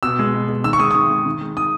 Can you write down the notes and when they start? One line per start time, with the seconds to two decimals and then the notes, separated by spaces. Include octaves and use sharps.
0.03 B2 E6
0.19 G#3
0.34 B2
0.49 G#3
0.64 D#3 E6
0.73 C#6
0.79 G#3 D#6
0.91 D#6
0.95 D#3 C#6
1.10 G#3
1.26 D#3
1.41 G#3
1.56 D#3 D#6